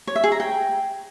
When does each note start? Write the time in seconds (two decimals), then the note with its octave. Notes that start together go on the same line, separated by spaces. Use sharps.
0.07 C#5
0.16 E5
0.24 G#4
0.32 A#5
0.40 G5